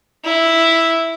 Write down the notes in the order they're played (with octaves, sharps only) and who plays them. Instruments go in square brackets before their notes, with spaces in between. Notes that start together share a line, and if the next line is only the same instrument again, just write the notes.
[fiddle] E4